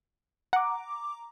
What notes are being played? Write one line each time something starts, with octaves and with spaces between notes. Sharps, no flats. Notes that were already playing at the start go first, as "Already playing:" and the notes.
F#5 A#5 D6